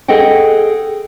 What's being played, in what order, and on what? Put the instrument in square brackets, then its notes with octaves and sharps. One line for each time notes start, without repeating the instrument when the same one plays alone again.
[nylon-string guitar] G#4 A4 D#5 F#5 G5